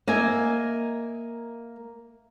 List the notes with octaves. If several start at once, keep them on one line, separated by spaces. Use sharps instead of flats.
A#3 D#5 E5 G#5